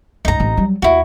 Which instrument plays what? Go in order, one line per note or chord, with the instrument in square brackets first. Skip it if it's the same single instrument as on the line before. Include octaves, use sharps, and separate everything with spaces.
[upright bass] C#2 G2 [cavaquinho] D#4 A#5
[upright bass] A1 C4
F#3 G3
[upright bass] D#2 [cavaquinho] E4 F#4